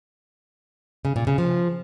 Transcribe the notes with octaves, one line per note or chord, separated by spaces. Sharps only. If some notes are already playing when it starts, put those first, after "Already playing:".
C#3
A#2
C#3
F3